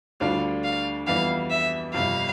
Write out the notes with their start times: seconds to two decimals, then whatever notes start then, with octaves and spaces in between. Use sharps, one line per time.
0.20 D2 D3 G3 D4 F4 F5
0.64 F5
1.07 F2 E3 G3 B3 E4 F5
1.50 E5
1.94 G1 F2 C3 G3 F5